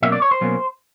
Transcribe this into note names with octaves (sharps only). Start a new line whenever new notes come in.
B2 F#3 A#3 C#4 E5
D5
C#5
C5
B2 F#3 A#3 C#4